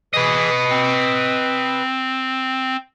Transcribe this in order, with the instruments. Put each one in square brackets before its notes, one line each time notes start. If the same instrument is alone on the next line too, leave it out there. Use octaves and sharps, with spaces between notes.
[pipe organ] E3 G#4 [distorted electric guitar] B4 D#5
[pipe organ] C4